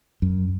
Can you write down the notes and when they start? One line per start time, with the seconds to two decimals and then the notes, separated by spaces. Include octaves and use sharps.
0.22 F#2